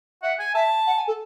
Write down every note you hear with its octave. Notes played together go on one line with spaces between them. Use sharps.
E5 F#5
G#5
E5 A5
F#5
G#5
A4